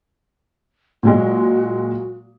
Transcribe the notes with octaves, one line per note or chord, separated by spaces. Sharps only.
A#2 F#3 G#3 F#4